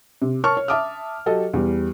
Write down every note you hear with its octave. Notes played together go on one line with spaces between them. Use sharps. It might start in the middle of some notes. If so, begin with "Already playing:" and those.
C3
A#4 C#5 A5 C#6 F6
C#5
E5 A5 D6 D#6 F6
F#3 G4 A4 D#5
E2 G3